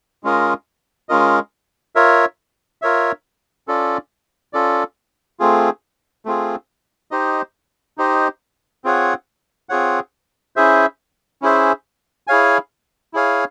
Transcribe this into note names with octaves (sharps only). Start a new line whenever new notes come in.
G#3 C#4 F4 A#4 D#5
G#3 C#4 F4 A#4 D#5
F4 A#4 C#5 E5
F4 A#4 C#5 E5
C#4 F4 A4 D5
C#4 F4 A4 D5
A3 C4 F4 G#4
A3 C4 F4 G#4
D#4 G4 C5 D#5
D#4 G4 C5 D#5
C4 F4 G#4 C#5 F#5
C4 F4 G#4 C#5 F#5
C#4 E4 G#4 C5 E5
C#4 E4 G#4 C5 E5
E4 G#4 C#5 F5 G#5
E4 G#4 C#5 F5 G#5